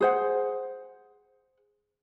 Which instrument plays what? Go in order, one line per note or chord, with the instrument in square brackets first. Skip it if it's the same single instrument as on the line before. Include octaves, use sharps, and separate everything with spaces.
[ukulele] G#4 C5 F#5